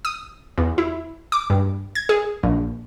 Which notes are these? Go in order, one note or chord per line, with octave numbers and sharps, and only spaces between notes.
D#6
E2
E4
D6
G2
G#6
G#4
A#1